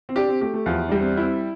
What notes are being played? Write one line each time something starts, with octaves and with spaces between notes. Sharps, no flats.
C4
D4 G4
C4
A3 G4
A3
E2 F3
G3 D4
C4
C4 E4